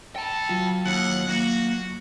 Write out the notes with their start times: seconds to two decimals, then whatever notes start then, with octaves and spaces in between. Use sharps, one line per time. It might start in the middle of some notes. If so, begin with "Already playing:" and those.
0.16 A4 G5 A5
0.49 F#3 F4
0.86 D#2 F#5
1.28 A#3 F#4